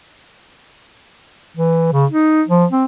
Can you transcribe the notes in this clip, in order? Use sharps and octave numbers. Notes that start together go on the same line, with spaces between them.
E3
C#3
D#4
F3
C4